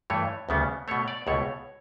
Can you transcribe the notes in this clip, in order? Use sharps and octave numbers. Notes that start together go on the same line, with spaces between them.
G2 E3 A3 C#5
D2 C#3 G3 B3
B2 A3 C#5
D5
C#2 B2 A3 C#5